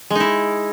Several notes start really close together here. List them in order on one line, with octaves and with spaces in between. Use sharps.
G#3 D#4 E4